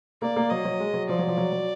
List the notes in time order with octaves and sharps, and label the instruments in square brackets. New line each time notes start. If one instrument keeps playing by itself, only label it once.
[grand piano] A#3 [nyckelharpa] D5
[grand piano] A#3
[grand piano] F#3 [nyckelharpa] D#5
[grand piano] F#3
G#3
F#3
[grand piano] F3 [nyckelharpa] D5
[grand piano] F#3
F3
F#3
F#3